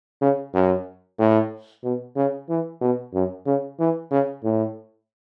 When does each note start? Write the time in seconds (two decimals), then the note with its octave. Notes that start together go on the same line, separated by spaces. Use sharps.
0.22 C#3
0.54 F#2
1.19 A2
1.84 B2
2.16 C#3
2.49 E3
2.81 B2
3.14 F#2
3.46 C#3
3.79 E3
4.11 C#3
4.44 A2